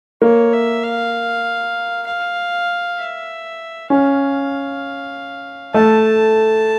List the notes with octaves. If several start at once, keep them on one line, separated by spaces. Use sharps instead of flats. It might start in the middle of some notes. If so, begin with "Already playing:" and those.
A#3 C#5
E5
F5
F5
E5
C#4 F5
A3 A5